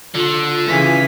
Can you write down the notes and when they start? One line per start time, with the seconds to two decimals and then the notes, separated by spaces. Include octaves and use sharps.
0.15 D3 F4
0.67 C#3 E3 G#5 B6